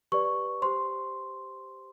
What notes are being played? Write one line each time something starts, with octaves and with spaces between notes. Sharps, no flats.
G4 B4 D5 C#6
G4 C5 C6